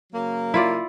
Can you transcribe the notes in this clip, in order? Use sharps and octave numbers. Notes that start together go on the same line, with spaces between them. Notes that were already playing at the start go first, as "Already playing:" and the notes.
C#3 F#3 A#3
E4 F4 D5